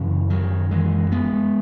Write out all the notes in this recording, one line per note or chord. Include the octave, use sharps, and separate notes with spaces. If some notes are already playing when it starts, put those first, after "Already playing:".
Already playing: F#2 C#3 E3
D#3 F#3
E3 G#3
G#3 B3